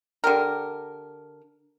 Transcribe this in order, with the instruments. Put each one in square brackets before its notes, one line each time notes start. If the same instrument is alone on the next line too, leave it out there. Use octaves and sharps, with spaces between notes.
[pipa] D3 G4 A#4